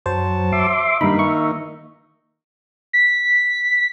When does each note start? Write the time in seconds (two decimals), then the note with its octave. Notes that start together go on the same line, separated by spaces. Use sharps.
0.06 F#2 F#3 C5 A5
0.52 E5 C6 D6
1.01 G2 D#3 A#3 D#4 B5
1.19 E5 C#6
2.93 B6